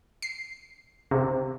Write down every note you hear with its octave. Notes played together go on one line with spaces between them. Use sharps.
C7
C3